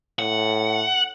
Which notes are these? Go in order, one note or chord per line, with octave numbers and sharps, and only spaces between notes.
A2 F#5